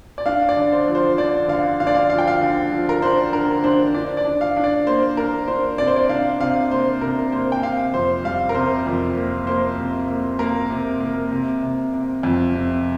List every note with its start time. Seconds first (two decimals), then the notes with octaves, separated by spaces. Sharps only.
0.18 D5
0.26 D4 F5
0.49 D5
0.57 D3
0.72 C5
0.88 F3
0.95 C5
1.18 D3 D5
1.48 D3 F5
1.80 D3 F5
1.87 D5
1.95 F5
2.10 F3 F5
2.18 G5
2.28 F5
2.41 D3
2.72 F3
2.89 A#4
3.02 D4 C5
3.33 D3 A#4
3.64 D4 C5
3.94 D4 D5
4.17 D5
4.25 D4
4.41 F5
4.57 D4
4.64 D5
4.87 A#3 C5
5.17 D4 A#4
5.48 D4 C5
5.78 C3 D5
5.87 C5
5.96 D5
6.09 D4 F5
6.40 C3 F5
6.71 A#3 C5
7.01 C3 A#4
7.32 A#3 C5
7.52 G5
7.63 C3 F5
7.93 F2 C5
8.24 G3 F5
8.49 A#4
8.55 C3 C5
8.86 F2
9.16 A#3
9.47 A#3 C5
9.78 C3
10.09 A#3
10.39 A#3 A#4
10.70 C3
11.01 A#3
11.32 C3
11.63 C3
11.93 C3
12.23 F2
12.54 C3